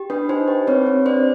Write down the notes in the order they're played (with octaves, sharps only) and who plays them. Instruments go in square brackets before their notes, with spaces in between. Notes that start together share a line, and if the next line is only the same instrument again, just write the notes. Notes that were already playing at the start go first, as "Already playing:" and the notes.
Already playing: [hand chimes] G4
D4 B4
D#4 C5
G4
C4 B4 C#5
C4
D4 C5 D5